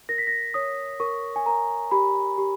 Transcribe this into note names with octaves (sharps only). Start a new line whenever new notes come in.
A#4 A#6
B6
A#6
C#5 D#6
A#4 C#6
G#5
A#4 A#5
G4 B5
G4